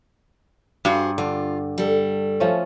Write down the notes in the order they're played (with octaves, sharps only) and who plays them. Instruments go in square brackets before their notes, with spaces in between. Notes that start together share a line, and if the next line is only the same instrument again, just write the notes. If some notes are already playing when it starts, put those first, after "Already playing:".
[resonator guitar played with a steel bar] G2 [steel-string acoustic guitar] F#4 G#4 C5
[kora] D3 [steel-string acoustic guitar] F4
[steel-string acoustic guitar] G3 A4
[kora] F3 A3 C#4